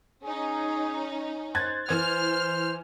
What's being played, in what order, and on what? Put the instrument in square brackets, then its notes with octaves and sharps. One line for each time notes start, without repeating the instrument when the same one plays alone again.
[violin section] C#4 D#4 [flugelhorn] G#4
[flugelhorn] C5 [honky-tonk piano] F#6 G#6 A6
[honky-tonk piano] E3 G#6 [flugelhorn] C5 [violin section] F6